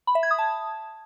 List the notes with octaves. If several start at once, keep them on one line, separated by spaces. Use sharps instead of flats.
B5
E5
G#6
D#6
A5